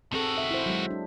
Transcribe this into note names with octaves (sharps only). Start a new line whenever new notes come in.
D#3 C4 F#4 G#4 A4
E5
E4 C5
F#3 G#3
D4